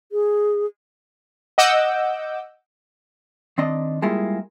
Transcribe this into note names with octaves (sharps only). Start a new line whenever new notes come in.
G#4
D#5 F#5 D6 E6 G6
D#3 C4 D4 D#5
G3 G#3 A#3 E4 F4 G#4